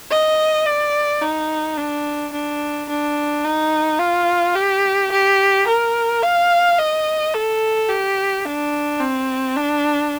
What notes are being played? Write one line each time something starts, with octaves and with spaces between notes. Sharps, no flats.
D#5
D5
D#4
D4
D4
D4
D#4
F4
G4
G4
A#4
F5
D#5
A4
G4
D4
C4
D4